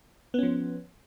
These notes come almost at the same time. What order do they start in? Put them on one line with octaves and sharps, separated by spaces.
B3 C#4 F3